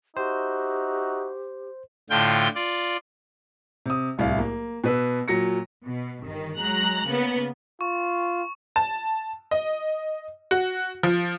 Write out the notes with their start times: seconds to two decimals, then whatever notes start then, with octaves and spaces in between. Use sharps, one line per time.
0.17 D#4 F#4 G4 C5 E5
2.10 A2 D3 F4 G5 G6
2.55 F4 D5
3.86 C3 D#6
4.18 D1 C2 E4 F5
4.39 A#3
4.84 B2 B4 E6
5.28 A#2 F#3 A#6 C#7
5.84 B2
6.23 G1 D#3
6.57 F#3 G#3 A#5 F#6
7.08 C#3 A#3 B3
7.81 F4 C#6
8.76 A5
9.51 D#5
10.51 F#4
11.03 F3